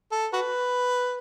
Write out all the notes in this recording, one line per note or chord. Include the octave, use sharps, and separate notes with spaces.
A4
F#4 B4